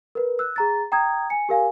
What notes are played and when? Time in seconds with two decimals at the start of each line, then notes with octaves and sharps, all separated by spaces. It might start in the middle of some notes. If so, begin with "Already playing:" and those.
0.15 A#4 B4
0.39 E6 F#6
0.56 G#4 A#5 A6
0.92 G5 A#5 D#6 G#6
1.30 G#5 C#7
1.49 G4 A#4 F5 G#5